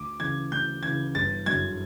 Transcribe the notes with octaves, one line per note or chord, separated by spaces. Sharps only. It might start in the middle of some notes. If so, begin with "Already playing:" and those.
Already playing: D2 D6
C#3 E3 G#6
D2 G6
C#3 E3 G#6
G1 A6
F#2 D3 G#6